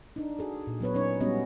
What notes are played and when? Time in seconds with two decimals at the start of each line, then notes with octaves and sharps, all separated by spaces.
0.16 D4 D#4
0.39 F#4 G#4 A4
0.67 A#2
0.81 F#3 B3 B4 C#5
0.94 F#3 C#4 D#4 C#5
1.20 G3 G#3 B3 C#4 F#4 D#5